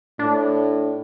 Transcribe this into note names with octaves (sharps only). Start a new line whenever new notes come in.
A2 D4